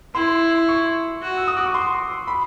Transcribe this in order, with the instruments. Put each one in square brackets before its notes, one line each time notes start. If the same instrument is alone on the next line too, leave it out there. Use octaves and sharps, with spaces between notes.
[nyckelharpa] E4 [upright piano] C6
[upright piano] C#6
[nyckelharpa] F#4
[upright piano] E6
D#6
D6
C#6
C6
B5